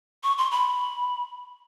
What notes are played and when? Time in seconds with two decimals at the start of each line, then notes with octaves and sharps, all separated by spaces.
0.23 C#6
0.38 C6
0.51 B5